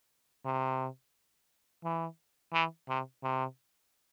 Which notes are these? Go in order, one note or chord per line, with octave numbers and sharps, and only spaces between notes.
C3
E3
E3
C3
C3